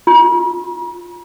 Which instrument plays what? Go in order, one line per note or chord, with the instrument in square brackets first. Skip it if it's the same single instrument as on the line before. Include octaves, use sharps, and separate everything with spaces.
[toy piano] F4